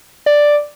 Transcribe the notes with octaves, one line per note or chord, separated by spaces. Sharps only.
D5